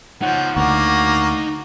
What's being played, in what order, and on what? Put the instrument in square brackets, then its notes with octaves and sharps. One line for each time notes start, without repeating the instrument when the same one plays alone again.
[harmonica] F3 [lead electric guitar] D#4 C#5 [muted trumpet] F#5
[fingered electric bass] D2 [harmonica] A#3 D5 [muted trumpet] F#4